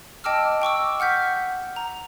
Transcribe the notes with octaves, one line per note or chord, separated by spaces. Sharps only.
D#5 G5 A5 D6 E6 F6
G5 C#6 D6 E6
F#5 F6 G6 B6
A#5